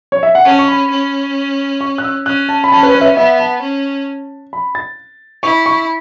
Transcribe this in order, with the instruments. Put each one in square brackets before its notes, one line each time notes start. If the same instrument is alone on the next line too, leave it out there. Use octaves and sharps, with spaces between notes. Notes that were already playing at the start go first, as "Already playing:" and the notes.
[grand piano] C#5
E5
F#5
[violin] C#4 [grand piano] A5
[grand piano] C#6
B5
[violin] C#4
[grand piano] C#6
F#6
E6
[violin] C#4 [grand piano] F#6
[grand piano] A5
B5
[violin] C#4 [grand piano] A5
[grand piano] B4
B4
E5
C#5
[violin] B3 [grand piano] E5
[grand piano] A5
[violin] C#4
[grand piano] B5
A6
[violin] E4 [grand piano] C#6
[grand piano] C#6